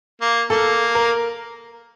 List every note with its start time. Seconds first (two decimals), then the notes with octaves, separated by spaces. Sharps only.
0.21 A#3
0.50 A#3 A4
0.95 A#4